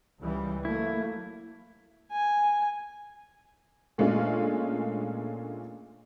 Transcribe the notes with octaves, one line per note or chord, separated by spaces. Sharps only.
C#2 E3 G3
F#3 A3 A#3 E4
G#5
A#2 G#3 A3 C#4 D4 F4